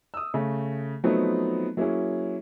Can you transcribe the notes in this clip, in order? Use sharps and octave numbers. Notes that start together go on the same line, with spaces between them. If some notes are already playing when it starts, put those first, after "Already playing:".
D#6 E6
C#3 A3
F3 F#3 A3 B3 C4 D#4
F#3 A#3 C#4 E4 G#4